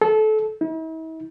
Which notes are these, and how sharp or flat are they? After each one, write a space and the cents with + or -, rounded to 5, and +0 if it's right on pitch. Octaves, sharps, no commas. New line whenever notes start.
A4 -25
E4 -45